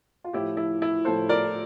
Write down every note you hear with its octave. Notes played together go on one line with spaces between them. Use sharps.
F4
A2 F3 E4 G4
E4
E4
A2 F3 A4 C5
A#4 D5